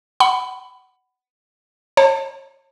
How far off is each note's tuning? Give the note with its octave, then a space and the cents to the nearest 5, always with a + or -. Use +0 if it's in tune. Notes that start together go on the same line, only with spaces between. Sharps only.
F#5 +20 B5 +15
C#5 -35 A5 +35